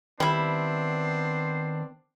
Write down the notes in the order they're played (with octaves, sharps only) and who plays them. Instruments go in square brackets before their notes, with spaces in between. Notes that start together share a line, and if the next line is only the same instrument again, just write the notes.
[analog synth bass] D#3 [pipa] G3 E4 [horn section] B3 C4 D4 [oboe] C5